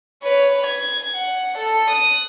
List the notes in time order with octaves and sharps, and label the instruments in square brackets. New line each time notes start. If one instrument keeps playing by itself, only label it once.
[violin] B4 C#5
G#6
F#5
A4
D#6 F#6